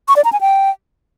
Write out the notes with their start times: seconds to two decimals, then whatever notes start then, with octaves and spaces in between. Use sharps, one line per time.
0.08 C#6
0.16 D5
0.24 A#5
0.33 G#5
0.41 G5